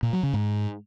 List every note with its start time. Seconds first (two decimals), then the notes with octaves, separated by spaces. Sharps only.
0.03 A#2
0.13 F#3
0.23 C#3
0.33 G#2